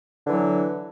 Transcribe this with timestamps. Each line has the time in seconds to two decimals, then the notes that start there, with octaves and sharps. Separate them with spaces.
0.24 D3
0.28 E3
0.32 F#3